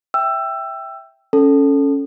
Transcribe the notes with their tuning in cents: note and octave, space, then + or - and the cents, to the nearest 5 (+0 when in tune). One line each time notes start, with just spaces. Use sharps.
E5 +0 G5 +0 E6 +20
C#4 +0 A4 +0